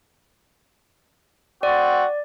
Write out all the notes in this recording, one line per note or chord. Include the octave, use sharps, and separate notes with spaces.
C4 F#4 D5